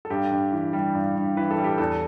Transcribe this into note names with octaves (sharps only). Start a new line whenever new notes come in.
A4
G2 G4
G2
E3
G3
G2
G2
E3 B4
A4
G3
G4
E2 A4